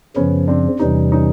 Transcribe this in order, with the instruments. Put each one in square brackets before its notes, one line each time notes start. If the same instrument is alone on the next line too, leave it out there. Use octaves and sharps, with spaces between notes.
[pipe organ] F#2 C#3 F3 [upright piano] B3 C#4
[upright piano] C4 D4
[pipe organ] E2 C3 E3 G3 [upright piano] C#4 D#4
[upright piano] C#4 D#4